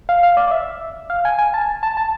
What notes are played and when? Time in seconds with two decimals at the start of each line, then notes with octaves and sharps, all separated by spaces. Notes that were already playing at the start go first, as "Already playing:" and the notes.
0.09 F5
0.23 F5
0.37 D5
0.47 D5
0.51 E5
1.10 F5
1.25 G#5
1.39 G#5
1.54 A5
1.83 A5
1.97 A5